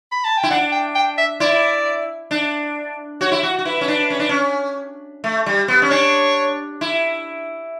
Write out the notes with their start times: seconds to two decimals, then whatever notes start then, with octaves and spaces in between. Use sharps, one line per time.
0.12 B5
0.25 A5
0.37 G5
0.43 E4
0.50 D4 F#5
0.72 G5
0.95 G5
1.18 E5
1.40 E4 D5
2.31 D4
3.21 F#4 C#5
3.32 E4
3.43 F#4
3.59 F#4
3.65 E4 B4
3.81 C#4
3.88 D4
4.10 C#4
4.19 D4
4.29 C#4
5.24 A3
5.46 G3
5.68 B3
5.82 C#4
5.91 D4 C#5
6.81 E4